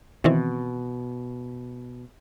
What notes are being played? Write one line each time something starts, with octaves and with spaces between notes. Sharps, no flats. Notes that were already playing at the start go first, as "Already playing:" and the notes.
B2 D#3 E3 C4